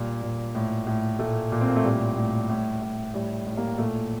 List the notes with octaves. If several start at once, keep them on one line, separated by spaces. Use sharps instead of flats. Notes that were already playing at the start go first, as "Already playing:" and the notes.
Already playing: A#2 G3
A#2
A2
A2
A#2 A3
A#2
C4
A#3
A3
A2 G3
A2
A2
A2
A2 G3
A2
G3 A#3
A#2 A3